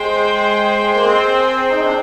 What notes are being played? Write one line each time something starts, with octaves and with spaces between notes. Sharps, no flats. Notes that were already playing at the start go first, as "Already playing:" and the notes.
Already playing: G#3 G#4 C5 G5
A#3
C4
D#4
D4